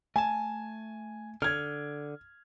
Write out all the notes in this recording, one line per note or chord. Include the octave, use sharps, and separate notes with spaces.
A3 G#5 A5
D3 F6 G#6